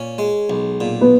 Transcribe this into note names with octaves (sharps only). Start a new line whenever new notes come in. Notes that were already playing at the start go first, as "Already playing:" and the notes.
Already playing: A#2 C#4
G#3
B1
A#2
B3